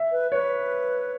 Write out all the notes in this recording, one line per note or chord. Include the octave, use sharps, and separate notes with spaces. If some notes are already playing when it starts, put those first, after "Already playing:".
Already playing: E5
B4
B4 C#5